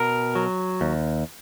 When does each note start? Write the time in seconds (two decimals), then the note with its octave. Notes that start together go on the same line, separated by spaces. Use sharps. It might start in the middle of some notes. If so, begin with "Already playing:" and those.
Already playing: B2 A#4
0.35 F#3
0.81 D#2